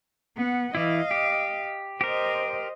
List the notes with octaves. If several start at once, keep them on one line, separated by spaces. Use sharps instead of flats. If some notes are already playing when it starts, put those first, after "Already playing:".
B3 F#5
E3 E4 D#5 F5
G4
G4 A#4 C5 D#5